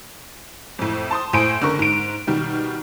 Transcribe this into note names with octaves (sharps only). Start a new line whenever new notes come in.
F2 A2
A5 C6 D#6
A2 C5 G#5 D7
F#1 D3 A#4 C#6
G#2 D7
B2 D#3 G3